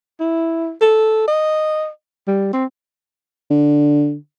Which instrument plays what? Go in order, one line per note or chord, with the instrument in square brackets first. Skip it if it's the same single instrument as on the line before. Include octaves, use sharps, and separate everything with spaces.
[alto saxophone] E4
A4
D#5
G3
C4
[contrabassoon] D3